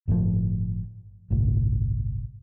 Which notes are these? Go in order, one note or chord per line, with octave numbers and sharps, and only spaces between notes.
G1 A2 C#3 F3
G1 C2 A2